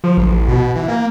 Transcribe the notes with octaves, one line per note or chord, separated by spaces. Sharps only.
F3
A1
B2
E3
A#3